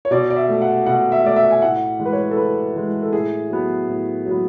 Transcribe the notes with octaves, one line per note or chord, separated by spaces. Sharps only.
C#5
B2 D5
D5
E5
A3
F#5
B2 F#5
E5
A3 D5
E5
G#5
A2 F#5
E3 G#3
B4
C#5
A4
A2 B4
E3 G#3
A4
A2 G#4
F#3 B3
A2
F#3
B3